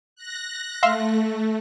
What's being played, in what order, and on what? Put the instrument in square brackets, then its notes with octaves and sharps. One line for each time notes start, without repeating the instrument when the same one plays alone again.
[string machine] F#6 A#6
[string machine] A3 [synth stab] E5 F5 C6